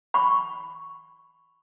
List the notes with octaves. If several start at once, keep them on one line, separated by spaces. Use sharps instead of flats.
B5 C#6